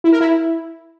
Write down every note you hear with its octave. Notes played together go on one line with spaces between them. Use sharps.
E4
A#4
E4